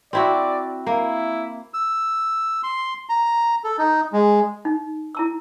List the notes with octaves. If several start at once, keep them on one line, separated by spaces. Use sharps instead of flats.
C4 E4 F#4 D5
A#3 E4
E6
C6
A#5
A4
D#4
G#3
D#4
E4 A5 E6